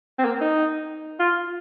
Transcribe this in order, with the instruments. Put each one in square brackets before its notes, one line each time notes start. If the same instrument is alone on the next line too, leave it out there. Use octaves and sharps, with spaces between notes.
[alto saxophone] C4
A#3
D#4
F4